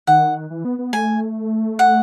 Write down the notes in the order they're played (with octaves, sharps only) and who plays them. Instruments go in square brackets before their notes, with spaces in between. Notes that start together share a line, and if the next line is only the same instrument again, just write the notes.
[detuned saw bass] D#3 [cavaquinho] F#5
[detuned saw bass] E3
B3
B3
[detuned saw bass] A3 [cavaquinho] G#5
[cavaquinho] F#5